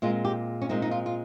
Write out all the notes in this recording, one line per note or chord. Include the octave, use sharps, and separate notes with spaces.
A#2 G#3 C4 F4
G4
C#4
A#2 G#3 C4 D#4
D#4
F4
F4